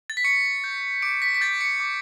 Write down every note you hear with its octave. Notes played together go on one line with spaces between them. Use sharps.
A6
B6
C#6 C#7
G6
D6 D7
B6
B6
G6 A6
C#7
D6